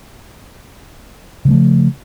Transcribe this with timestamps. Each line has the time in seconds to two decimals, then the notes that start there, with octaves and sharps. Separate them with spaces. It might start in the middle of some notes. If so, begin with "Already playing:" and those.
1.45 C#3
1.48 G3
1.51 A3
1.53 F3